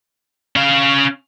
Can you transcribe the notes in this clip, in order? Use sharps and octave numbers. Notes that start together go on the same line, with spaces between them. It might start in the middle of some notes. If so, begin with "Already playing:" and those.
C#4 F5